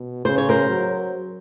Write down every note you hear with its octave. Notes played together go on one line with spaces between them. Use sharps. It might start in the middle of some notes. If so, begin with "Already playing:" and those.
Already playing: B2
C#3 C5
C#5
A#4 C5
F#3